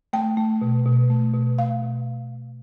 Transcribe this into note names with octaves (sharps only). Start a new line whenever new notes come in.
A3 G5
A3
B2
B2
A3
B2
A3 F5
B2